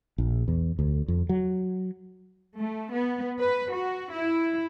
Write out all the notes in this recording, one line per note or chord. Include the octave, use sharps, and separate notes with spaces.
A#1
E2
D2
F2
F#3
A3
B3
B4
F#4
E4